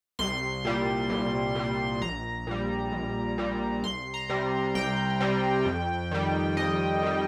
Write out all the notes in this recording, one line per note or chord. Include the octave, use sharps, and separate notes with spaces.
C2 C6
A#2 G3
C2
A#2 G3
A#1 A#5
A#2 G3
A#1
A#2 G3
C2 C6
A#5
C3 G3
C2 G5
C3 G3
F2
D#3 G3
F2 D#5
D#3 G3